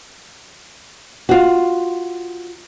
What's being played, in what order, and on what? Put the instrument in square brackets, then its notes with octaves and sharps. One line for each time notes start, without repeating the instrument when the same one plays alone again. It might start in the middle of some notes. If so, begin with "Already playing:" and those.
[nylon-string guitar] F4 F#4